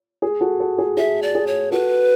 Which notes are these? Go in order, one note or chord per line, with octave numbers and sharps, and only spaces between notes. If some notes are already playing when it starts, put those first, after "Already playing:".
G#4
F#4 A4
F#4 A4
G#4
G#4 E5
D5
G#4
C#5
F#4 A4 B4